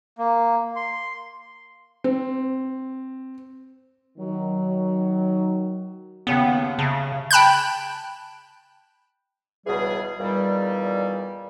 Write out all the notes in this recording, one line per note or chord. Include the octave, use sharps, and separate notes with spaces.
A#3
C6
C4
D#3 F#3
D#2 C#3 B3 G5
C#3 E5 A5
G5 A5 B5 F#6 G6
C#2 B2 E3 G3 G#4
E2 A#2 D#3 G3